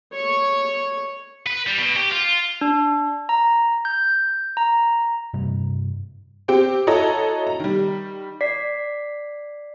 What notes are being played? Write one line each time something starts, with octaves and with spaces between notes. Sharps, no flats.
C#5 C#6
B4
G3
B2
G4
F4
D4
A#5
G6
A#5
G2 C3 G3
C4 G4 G5
E4 F#4 A4 C#5 D#5 A#5
A#5
D#3 G3
D5 B6 C7